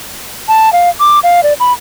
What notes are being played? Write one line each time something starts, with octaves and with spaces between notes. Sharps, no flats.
A5
F5
D6
F5
D5
B5